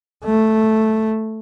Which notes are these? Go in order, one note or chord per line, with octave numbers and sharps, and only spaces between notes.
A3